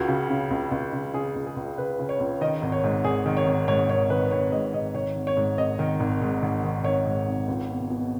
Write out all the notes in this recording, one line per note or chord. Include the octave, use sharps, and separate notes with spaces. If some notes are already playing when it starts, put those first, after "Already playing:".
Already playing: C#2 F#4
C#3
C#3
C#2
C#2
C#3
C#3 G#4
C#2
G#4
C#2
C#3 B4
C#3
C#5
C#2
D#3 D#5
G#1
C#5
G#2
G#1 G#4
D#3
C#5
G#1
G#2 C#5
G#1 C#5
D#3 B4
G#1 C#5
G#2 D#5
G#1 D#5
D#3 C#5
G#1
C#5
G#2
G#1 D#5
D#3
G#1
G#2
G#1
D#3
G#1 C#5
G#2
G#1
C#2
B2
B2